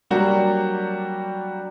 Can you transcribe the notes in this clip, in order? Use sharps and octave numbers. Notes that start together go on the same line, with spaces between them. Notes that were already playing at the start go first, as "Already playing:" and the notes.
F#3 G3 A#3 D4 F#4 G4